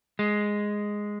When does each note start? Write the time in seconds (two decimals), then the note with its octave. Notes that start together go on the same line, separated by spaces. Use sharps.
0.19 G#3